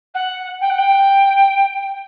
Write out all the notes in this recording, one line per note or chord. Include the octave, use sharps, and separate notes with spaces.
F#5
G5
F#5
G5